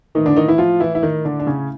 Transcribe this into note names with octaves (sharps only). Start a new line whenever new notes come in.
A2 D#3 E3 D#4
D3 D4
D#3 D#4
E3 E4
F3 F4
E3 E4
E4
D#3 D#4
D3 D4
D4
C#3 C#4